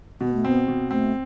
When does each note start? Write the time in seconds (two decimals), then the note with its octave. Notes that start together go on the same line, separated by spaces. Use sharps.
0.21 B2 B3
0.34 A3
0.45 B3 C4
0.68 B2
0.91 A3 C4